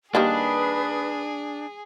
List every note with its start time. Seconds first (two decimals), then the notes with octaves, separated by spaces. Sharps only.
0.15 D#3 G3 A#3 D4 G#4 B4 D#6